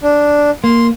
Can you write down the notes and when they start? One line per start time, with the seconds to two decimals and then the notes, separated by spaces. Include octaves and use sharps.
0.03 D4
0.64 A#3 C6